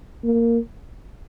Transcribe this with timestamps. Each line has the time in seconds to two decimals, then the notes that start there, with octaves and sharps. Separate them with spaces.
0.24 A#3